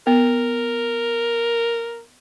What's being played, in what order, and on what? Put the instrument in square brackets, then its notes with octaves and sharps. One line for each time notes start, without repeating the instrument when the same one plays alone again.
[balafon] B3 [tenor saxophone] A#4